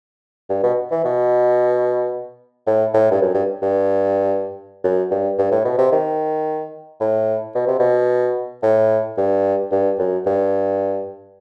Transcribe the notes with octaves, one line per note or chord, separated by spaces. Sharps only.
G2
B2
E3
B2
A2
A2
G2
F#2
G2
G2
F#2
G2
G2
A2
B2
C3
D#3
A2
B2
C3
B2
A2
G2
G2
F#2
G2